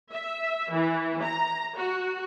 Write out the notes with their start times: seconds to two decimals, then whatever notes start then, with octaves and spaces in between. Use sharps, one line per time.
0.11 E5
0.72 E3
1.23 A#5
1.77 F#4